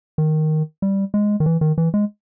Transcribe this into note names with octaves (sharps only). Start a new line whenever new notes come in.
D#3
G3
G#3
D#3
E3
D#3
E3
G#3